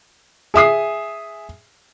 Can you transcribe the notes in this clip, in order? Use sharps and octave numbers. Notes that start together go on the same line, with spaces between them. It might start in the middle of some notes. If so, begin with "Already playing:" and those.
G#4 E5 D#6 C7